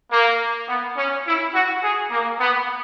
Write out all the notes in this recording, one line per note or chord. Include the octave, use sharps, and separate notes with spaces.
A#3
B3
C#4
E4
F#4
G#4
A#3
B3